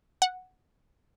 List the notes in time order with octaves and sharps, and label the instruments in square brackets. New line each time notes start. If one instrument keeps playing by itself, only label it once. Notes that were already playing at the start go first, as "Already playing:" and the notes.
[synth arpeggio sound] F#5